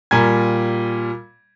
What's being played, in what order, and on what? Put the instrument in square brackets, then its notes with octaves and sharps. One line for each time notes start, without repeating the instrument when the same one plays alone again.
[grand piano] A#2 G3 A#4 G#5 G#6